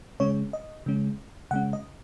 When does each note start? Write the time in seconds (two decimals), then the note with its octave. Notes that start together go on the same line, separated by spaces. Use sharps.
0.20 C#3 G#3 C#4 C#5
0.53 D#5
0.86 C#3 G#3 C#4
1.51 C#3 G#3 C#4 F#5
1.73 D#5